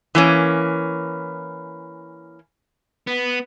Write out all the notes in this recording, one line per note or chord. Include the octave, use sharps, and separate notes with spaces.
E3 A#3 C#4
B3